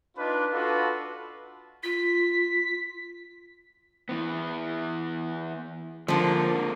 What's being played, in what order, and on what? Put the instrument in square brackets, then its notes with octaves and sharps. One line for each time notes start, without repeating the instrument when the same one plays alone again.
[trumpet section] D4 D#4 F4 B4
D4 F4 F#4 A4 B4
[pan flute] F4 [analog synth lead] B6
[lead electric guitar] E3 B3
[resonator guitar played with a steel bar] D3 F3 [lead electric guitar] G#3 A#3